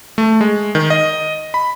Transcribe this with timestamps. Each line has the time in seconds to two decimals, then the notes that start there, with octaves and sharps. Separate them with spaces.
0.18 A3
0.41 G#3
0.75 D#3
0.90 D#5
1.54 B5